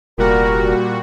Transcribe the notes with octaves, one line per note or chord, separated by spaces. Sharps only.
F1 A#2 G3 F#4 A#4